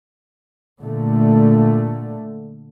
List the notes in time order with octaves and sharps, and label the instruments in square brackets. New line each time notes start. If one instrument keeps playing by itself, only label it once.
[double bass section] A#2 D3 A3